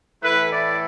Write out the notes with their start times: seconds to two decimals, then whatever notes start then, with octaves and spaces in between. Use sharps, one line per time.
0.22 A2 E3 A3 E4 B4
0.51 D5